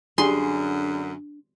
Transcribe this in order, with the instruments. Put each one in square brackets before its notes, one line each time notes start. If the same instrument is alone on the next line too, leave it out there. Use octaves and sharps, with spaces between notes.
[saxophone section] F#2 D3 [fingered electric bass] D4 [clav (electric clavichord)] G#4 [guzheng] C6